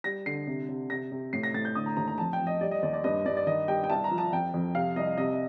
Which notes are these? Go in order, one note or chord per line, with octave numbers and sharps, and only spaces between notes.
G3 A#6
D3 C7
C3
C3
C3 A#6
C3
A2 C7
A#6
A2 A6
G6
D3 D#6
A#5
D#2 A#5
A#5
F2 A5
G5
F2
D#5
G3 D5
D#5
D#2 D5
D5
G2 D#5
G2 D5
D5
D#3 D#5
G3 G5
G5
C2 A5
A#5
F3
A5
F2 G5
F2
C3 F5
C2 D#5
C3 D#5